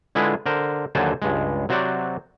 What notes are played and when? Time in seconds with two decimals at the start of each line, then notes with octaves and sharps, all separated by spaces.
0.15 D3 G#3 E4 F4 G#4 B4
0.46 D3 A#4 C5
0.95 D#2 D3 F#3 C5 G#5 A5
1.22 C#2 G2 G#3
1.69 C3 F#3 F#4 C5 D5